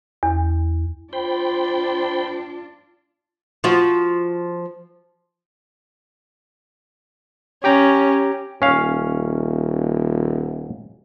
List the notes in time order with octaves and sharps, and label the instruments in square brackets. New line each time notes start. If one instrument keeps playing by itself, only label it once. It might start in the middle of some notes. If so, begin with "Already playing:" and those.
[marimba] E2
[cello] D4 F4 [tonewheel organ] C5 G5 B5
[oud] F3 F4 F#4
[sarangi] C#4 [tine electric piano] G4 G5 A#5
[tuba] D#1 [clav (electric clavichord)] C#4 F5